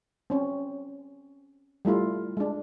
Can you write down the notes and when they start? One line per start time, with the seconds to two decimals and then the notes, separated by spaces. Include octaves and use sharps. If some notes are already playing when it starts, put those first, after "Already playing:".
0.30 C4 C#4
1.85 G3 A3 E4 F4
2.37 G#3 D4